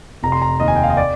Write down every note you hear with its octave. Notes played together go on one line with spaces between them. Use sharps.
F1 A#5
C6
A#5
D#2 D#3 D#5
G#5
G5
F5
D#5
D5